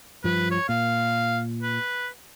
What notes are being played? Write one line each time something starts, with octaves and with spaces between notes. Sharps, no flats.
G2 F3 B4
C#5
A#2 F5
B4